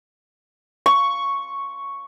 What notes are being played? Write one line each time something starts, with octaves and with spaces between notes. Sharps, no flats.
C#6